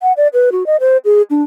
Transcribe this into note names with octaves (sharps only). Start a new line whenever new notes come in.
F#5
D5
B4
F#4
D#5
C5
G#4
D4